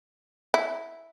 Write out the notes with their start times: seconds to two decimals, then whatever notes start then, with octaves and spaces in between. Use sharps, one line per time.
0.54 E4